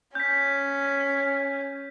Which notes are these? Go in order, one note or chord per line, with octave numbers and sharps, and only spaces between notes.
C#4 G6 B6